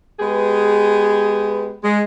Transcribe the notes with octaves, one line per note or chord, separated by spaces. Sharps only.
G#3 B3 G4 G#4 B4
G#3